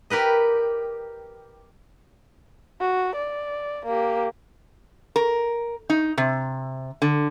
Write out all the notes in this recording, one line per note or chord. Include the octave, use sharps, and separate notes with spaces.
G4 A#4 B4 D#5
F#4
D5
A#3 G4
A#4
D#4
C3
D3